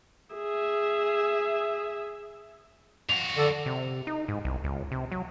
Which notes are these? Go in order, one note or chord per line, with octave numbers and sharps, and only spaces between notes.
G#4 E5
F2 F#4 F7
D3 A4 D5
C3
D#4
G#2
C2
C#2
C3
F#3